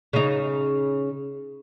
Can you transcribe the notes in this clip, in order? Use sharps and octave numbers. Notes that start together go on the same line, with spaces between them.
C#3 D#4